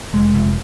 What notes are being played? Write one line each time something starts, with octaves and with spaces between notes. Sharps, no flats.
F1 G#3
F1